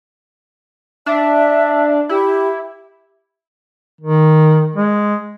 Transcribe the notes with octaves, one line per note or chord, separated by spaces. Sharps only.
D4 E5
E4 G4
D#3
G#3